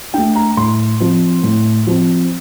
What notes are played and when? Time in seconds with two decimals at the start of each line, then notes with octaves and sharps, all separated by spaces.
0.14 A3 D4 G5
0.35 A#5
0.57 A2 C6
1.00 F3 C4
1.43 A2
1.87 F3 C4